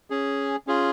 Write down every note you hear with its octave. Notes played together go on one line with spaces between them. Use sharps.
C#4 G#4
C#4 F4 G#4